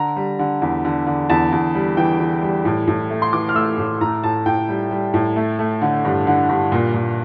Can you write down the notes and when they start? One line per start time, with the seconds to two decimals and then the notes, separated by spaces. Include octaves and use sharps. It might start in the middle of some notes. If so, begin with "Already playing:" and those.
Already playing: D3 A#5
0.16 G3
0.39 D3
0.62 E2
0.85 D3
1.07 D3
1.30 E2 A5
1.52 E2
1.75 G3
1.97 E3 G5
2.20 E3
2.43 G3
2.65 A2
2.87 A2
3.10 A3
3.22 C6
3.33 E3 D6
3.49 F6
3.55 A3 E6
3.78 A2
4.01 A2 A#5
4.24 A2 A5
4.46 A2 G5
4.69 G3
4.91 G3
5.14 A2
5.36 A3
5.59 A3
5.82 D3
6.05 G2
6.27 D3
6.49 G2
6.72 A#2
6.94 A#2